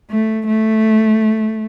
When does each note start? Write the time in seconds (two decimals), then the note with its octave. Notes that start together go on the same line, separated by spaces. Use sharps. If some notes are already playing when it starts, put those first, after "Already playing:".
0.10 A3
0.47 A3